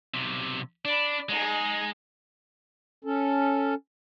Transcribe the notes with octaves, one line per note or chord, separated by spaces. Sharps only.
B1 C3
D4 D5 B5
G#3 D#4 G#4
C#4 A4